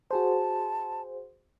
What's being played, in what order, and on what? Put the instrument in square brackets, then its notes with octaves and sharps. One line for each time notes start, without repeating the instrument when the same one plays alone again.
[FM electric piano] F#4 G#4 C5 [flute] A5